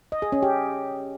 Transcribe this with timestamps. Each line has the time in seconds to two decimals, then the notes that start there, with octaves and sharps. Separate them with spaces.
0.12 D#5
0.22 G#4
0.32 C#4
0.43 G4